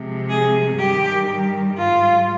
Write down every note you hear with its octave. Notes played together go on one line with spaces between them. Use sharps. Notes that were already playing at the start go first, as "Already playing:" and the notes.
Already playing: C3 F3 G#3
G#4
G2 D#3 G3 G4
G#2 G3 F4